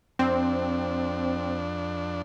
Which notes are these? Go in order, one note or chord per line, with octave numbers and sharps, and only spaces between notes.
F2 C4 D4